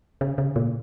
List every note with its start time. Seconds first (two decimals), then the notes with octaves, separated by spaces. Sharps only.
0.21 C#3
0.38 C#3
0.56 A#2